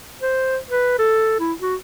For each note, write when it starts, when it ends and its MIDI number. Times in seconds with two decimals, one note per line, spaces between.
0.22 0.57 72
0.70 0.96 71
0.99 1.36 69
1.40 1.53 64
1.61 1.75 66